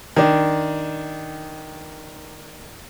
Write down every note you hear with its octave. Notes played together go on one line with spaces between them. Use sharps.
D#3 D4